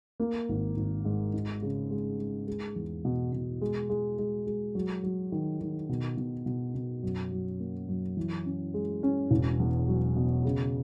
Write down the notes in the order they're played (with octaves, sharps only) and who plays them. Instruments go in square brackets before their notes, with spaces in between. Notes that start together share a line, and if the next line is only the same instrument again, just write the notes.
[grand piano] A#3
G#1
G#1
G#2
D#4
C#3
G#3
G#3
G#3
E2
B2
B2
G#3
G#3
G#3
G#3
F#3
F#3
D#3
D#3
B2
B2
B2
B2
F#2
F#3
A#3
F#2
E3
C#4
G#3
C#4
E1
E2
F#3
B2
C#3